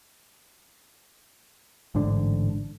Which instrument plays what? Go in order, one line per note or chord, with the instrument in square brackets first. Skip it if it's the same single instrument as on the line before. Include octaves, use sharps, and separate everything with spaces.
[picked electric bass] A1 G#2 D3 D4